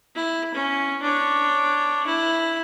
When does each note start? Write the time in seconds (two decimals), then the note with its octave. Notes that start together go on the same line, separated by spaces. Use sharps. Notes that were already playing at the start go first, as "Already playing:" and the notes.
0.15 E4
0.54 C#4
1.02 D4 C#5
2.06 E4